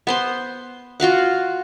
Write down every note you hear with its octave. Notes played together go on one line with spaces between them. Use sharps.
B3 C5 C6
F4 F#4 F5 F#5